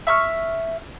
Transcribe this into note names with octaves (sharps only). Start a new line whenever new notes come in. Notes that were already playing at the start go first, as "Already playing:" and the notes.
E5 C#6 F6